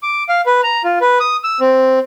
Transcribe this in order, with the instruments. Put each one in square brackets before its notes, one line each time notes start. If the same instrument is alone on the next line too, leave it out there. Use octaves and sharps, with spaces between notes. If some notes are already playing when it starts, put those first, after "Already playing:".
[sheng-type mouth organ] D6
F5
B4
A#5
F4
B4
D#6
E6
C4